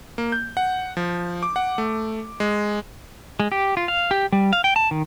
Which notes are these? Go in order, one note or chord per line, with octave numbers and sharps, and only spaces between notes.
A#3
G6
F#5
F3
D6
F#5
A3
G#3
G#3
G4
F4
F5
G4
G3
F5
G5
A5
D#3